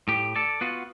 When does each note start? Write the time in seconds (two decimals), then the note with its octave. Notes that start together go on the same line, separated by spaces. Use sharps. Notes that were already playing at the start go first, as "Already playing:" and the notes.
0.08 A2 G4
0.36 A4 D5
0.61 B3 F4 F#4